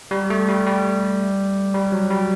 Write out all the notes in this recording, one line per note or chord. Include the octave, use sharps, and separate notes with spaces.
G3
A3
G3
G3
G3
F#3
G3